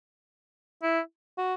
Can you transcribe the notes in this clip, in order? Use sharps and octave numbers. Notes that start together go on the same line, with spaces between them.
E4
F#4